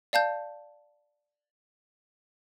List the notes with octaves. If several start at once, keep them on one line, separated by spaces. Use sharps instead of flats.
D5 F5 A5 G6